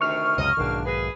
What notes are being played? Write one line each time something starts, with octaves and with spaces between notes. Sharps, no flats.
D2 C3 D#3 C#6 F6
C#2 F#2 C3 D#5
B1 E2 G#2 D#3 A#3 D4
G#4 B4